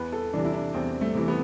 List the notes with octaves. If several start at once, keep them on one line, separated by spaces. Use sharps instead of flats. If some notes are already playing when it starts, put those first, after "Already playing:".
Already playing: E2 B4
A4
C3 E3 D4
E4
D4
E2 C4
A3
C3 E3
B3